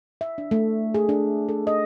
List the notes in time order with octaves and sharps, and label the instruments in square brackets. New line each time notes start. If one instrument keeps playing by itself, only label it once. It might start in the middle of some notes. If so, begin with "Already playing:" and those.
[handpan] E5
D4
A3
G#4
D4
A4
D#5